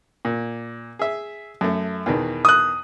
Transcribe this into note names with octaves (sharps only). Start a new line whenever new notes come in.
A#2
G#4 E5
F#2 A3
E2 B2 D#3
D#6 F#6